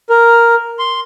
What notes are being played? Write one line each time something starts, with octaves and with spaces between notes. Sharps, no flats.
A#4
C6